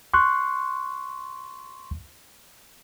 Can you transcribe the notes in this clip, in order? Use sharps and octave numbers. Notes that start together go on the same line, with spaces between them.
C6 C#6 F#6